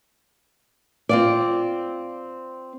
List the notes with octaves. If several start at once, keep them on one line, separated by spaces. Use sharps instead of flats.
C4 F4 D5